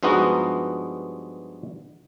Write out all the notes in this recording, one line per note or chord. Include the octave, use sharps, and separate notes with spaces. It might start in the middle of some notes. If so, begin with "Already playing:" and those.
G2 F3 G#3 B3 D#4 F#4